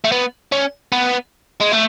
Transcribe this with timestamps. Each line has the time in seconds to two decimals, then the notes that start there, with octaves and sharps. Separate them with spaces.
0.04 A3
0.12 B3
0.52 C#4
0.92 B3
1.61 G#3
1.72 A3